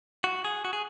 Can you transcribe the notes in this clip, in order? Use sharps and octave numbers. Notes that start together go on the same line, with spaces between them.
F#4
G#4
F#4
G#4